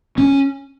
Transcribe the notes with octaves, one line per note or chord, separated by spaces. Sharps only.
C#4